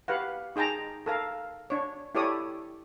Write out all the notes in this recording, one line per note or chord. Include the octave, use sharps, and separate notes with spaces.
G4 B4 F5 F#5
D#4 G#4 G5 A5 A#5
A4 A#4 F5
D4 C#5
E4 G4 A4 C#5 D5 D#6